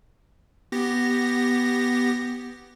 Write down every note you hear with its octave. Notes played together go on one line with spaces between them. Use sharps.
B3 G4 A#6